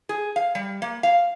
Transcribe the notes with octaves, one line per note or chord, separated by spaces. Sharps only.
G#4
F5
G3
A#3
F5